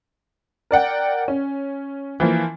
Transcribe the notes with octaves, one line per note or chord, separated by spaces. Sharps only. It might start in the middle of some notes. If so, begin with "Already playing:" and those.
A#4 D5 F#5 G5
C#4
E3 F3 A#3